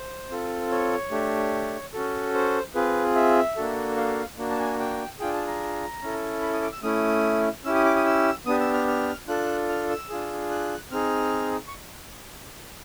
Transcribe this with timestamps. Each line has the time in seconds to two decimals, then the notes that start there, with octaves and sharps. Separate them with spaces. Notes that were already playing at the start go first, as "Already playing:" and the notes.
Already playing: C5
0.30 C4 F4 A4
0.71 C#5
1.11 A3 D4 G4
1.93 C#4 F#4 A4
2.34 C5
2.75 C4 F4 G#4 B4
3.15 E5
3.57 A#3 D4 F#4 A4
3.97 F5
4.38 A#3 D4 F#4
4.51 A5
4.59 G#5
4.80 G5
5.19 D4 F4 G#4 G5
5.33 A5
5.47 A#5
6.02 C#4 E4 A4
6.42 B5
6.53 D#6
6.62 D6
6.72 E6
6.83 A3 C#4 E4 D#6
7.65 C#4 E4 G4 E6
7.75 D#6
7.86 D6
7.96 D#6
8.06 E6
8.46 B3 D4 G4 D#6
8.60 E6
8.73 F6
8.88 F6
9.28 D4 F4 A4 F#6
9.69 F6
9.90 E6
10.10 D4 F4 G#4
10.50 F#6
10.91 C4 D#4 G#4 F6
11.68 C#6